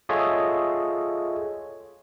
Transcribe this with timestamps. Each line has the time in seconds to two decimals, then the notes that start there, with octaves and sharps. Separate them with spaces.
0.09 F4 G#4 A4 C#5 D#5 E5